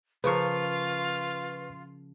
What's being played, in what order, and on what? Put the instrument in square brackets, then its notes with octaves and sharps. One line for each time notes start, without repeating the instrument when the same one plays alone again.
[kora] C#3 F3 A#4 [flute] F4 [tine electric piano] B4 C#6